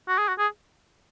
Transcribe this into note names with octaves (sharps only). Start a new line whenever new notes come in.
F#4
G#4
F#4
G#4